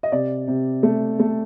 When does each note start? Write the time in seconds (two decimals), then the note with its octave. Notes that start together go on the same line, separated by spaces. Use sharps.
0.03 D#5
0.12 C3 D5
0.48 C3
0.83 A3
1.19 A3